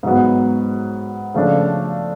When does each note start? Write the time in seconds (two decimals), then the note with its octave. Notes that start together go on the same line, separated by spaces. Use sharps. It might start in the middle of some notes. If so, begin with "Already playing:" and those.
0.03 G#2 F#3 B3
1.34 C#3 F3 A3 D4